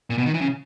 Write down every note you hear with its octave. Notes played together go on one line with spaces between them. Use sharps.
A#2
B2
D#3
E3
C#3